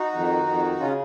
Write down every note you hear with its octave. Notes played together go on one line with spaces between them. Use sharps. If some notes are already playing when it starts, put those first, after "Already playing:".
Already playing: D#4 F#4
F2 D#3
F2 D#3
C#3 C#4 F4